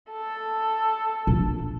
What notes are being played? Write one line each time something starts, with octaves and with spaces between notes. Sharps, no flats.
A4
A#2 D4